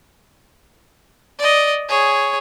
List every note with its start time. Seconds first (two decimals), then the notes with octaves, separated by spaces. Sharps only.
1.39 D5 D#5
1.88 G#4 C#5